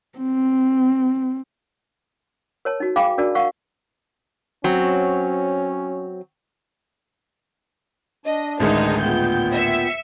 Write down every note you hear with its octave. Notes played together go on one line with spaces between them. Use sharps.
C4
A#4 C#5 A5
D#4 F#4
G#4 F5 G5 G#5 B5 D6
D4 F#4 A#4 D5 A5
A#4 F5 F#5 C#6
F#3 C4 C#4
D4 D#5
A1 D2 D#3 G#3 D#4
A#2 B3 G5 G6
E5 C#7